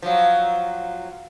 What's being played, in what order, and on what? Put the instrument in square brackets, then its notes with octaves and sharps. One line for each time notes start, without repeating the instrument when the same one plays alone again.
[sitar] F3 F#3